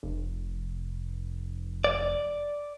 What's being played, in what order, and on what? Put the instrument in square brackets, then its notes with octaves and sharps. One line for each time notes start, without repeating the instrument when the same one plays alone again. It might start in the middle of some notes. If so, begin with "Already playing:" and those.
[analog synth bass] F1
[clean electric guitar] D5